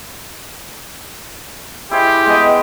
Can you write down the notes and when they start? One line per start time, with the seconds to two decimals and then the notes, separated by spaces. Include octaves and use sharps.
1.91 E4 G4 G#4 C5
2.26 G#3 B3 D#5